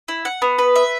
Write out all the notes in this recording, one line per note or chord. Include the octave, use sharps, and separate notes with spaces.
E4
F#5
B3
B4
E5